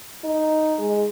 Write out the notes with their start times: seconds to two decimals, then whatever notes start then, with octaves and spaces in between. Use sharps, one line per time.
0.24 D#4
0.79 G#3